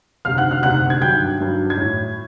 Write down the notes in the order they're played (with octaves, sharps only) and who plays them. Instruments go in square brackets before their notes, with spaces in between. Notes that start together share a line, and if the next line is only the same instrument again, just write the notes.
[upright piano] D2 C3 D#3 F5 F6
F#5 F#6
F5 F6
D2 C3 D#3 F#5 F#6
G#6
G2 D#3 F#3 G5 G6
G2 D#3 F#3
G#6
A2